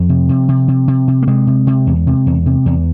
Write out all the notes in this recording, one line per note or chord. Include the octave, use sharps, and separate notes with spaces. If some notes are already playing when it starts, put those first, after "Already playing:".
Already playing: F2 F3
C3
C3
C3
C3
C3
C3
A#3
C3 G#3
C3
C3
E2
C3
E2
C3
E2